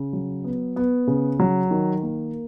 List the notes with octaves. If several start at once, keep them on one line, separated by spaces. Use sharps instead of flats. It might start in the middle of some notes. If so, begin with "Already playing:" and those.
Already playing: C#3
F#3
B3
B3
C#3
F#3
D#3
A#3